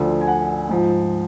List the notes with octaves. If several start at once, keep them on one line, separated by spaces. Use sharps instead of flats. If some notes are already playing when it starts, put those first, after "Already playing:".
Already playing: D2 D3 F3
G#5
F#5
G#2 F3